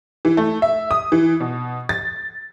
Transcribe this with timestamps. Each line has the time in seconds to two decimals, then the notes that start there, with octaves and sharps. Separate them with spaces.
0.25 E3
0.37 A3
0.62 E5
0.91 D#6
1.12 E3
1.40 B2
1.89 A6